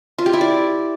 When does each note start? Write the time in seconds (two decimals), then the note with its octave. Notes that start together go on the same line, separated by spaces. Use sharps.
0.18 F4
0.26 G4
0.33 E4
0.41 D5